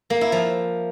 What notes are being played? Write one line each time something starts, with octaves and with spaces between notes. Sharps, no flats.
A#3
E4
F3